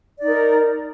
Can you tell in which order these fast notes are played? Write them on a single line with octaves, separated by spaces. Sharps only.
D5 D#4 A#4